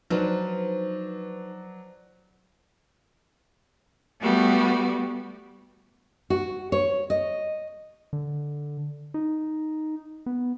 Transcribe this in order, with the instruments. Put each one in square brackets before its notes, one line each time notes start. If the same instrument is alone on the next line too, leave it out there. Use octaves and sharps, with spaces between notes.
[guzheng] F3 [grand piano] F#3 D4 [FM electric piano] D#4 B4 C5
[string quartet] G3 A3 B3 F#4 G4
[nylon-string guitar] F#4
C#5
D#5
[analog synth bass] D3
D#4
B3